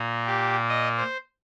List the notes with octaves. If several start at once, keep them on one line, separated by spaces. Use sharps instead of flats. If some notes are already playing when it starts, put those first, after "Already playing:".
Already playing: A#2 A#3
G4
D#5
C5